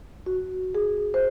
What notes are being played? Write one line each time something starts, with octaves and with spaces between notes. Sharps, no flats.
F#4
G#4
C5